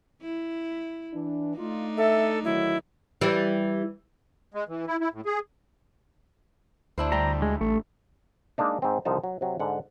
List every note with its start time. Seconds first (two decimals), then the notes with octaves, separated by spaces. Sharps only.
0.22 E4
1.14 E3 D4
1.57 A3 D4 D#4 F4
1.97 A4 E5
2.44 D2 D#3 F#3 E4
3.21 E3 G3
4.54 G#3
4.69 E3
4.87 E4
5.00 E4
5.13 A2
5.25 G#4
6.98 D2 D4 E4 C5
7.12 G3 G4 A#5
7.42 G#3
7.61 A1 A3
8.58 G#3 A#3 D4 D#4
8.82 G#2 C4
9.05 C2 D3 F3 D#4 A5
9.24 F#3
9.41 C3 F#3
9.59 G#2 D3 F#5